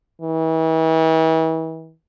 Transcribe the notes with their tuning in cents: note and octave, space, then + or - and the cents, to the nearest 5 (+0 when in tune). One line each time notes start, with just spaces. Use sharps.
E3 -40